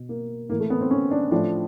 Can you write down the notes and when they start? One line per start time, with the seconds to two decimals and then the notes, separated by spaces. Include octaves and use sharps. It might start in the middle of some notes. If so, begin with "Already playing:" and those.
Already playing: B2
0.09 A#3
0.49 A2 E3 A#3
0.60 A3
0.70 B3
0.81 C4
0.91 C#4
1.11 D4
1.31 A2 F3 D4